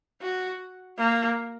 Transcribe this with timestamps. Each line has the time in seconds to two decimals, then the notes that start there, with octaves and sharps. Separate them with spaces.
0.22 F#4
0.98 A#3